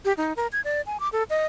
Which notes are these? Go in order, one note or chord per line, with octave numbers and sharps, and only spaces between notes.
G4
D#4
A#4
G#6
D5
G#5
D6
A4
D#5